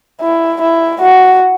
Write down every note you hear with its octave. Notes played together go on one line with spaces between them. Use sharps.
E4
E4
F#4